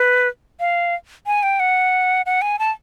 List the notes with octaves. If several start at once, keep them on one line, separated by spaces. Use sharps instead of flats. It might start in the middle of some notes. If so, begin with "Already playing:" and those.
Already playing: B4
F5
G#5
G5
F#5
F#5
G#5
A5